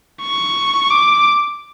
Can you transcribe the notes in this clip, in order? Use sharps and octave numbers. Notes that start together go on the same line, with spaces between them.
C#6
D6